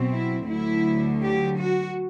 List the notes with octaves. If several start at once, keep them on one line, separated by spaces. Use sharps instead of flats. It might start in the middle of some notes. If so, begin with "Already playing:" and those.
Already playing: B2 F#3 C4
E4
D2 D3 F#3 E4
G4
F#4